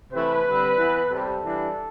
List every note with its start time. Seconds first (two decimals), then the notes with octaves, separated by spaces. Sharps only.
0.13 C3 E3 A3 E4 B4
0.46 D3 G3 C4
0.78 E3 B3 E4
1.10 C3 G3 C4 A4
1.42 E3 G3 D4